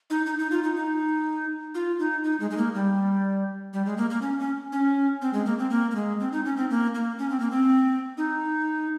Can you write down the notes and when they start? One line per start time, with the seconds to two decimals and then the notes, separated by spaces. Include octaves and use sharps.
0.10 D#4
0.26 D#4
0.39 D#4
0.51 F4
0.63 D#4
0.76 D#4
1.75 F4
1.99 D#4
2.24 D#4
2.40 G#3
2.51 G#3
2.57 A#3
2.74 G3
3.73 G3
3.86 G#3
3.97 A#3
4.10 A#3
4.22 C#4
4.39 C#4
4.72 C#4
5.22 C4
5.33 G#3
5.46 A#3
5.59 C4
5.70 A#3
5.91 A#3
5.95 G#3
6.20 C4
6.32 D#4
6.45 C#4
6.57 C4
6.70 A#3
6.95 A#3
7.19 C#4
7.30 C4
7.40 A#3
7.51 C4
8.18 D#4